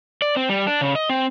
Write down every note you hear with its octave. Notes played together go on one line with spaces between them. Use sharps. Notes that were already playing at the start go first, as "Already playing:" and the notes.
D5
C4
G3
D4
C#3
D#5
C4